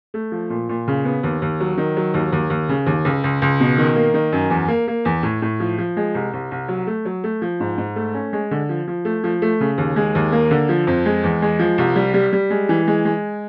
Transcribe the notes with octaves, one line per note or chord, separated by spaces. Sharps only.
A3
F3
A#2
A#2
C#3
B3
D#2
D#2
F#3
D#3
F#3
D#2
D#2
D#2
C#3
D#2
C#2
C#2
C#2
B2
D#3
A#3
D#3
F#2
E2
A#3
A#3
E2
A2
A2
F3
F3
G#3
C2
C2
C2
F#3
A3
F#3
A3
F3
G#2
G#2
A3
C#4
G#3
D3
F3
F3
A3
F3
A3
C#3
D#2
G#3
D#2
A#3
D3
F3
F2
G#3
E2
G#3
F3
C2
G3
G3
G3
G#3
E3
G#3
G#3